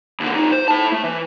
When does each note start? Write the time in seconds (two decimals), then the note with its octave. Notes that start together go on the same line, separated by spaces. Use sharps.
0.20 D#2 D3
0.31 F2 D#4
0.52 C5
0.68 E4 A5
0.92 A3
1.04 E3